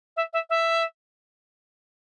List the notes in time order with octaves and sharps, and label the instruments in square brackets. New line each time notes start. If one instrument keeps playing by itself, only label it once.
[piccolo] E5
E5
E5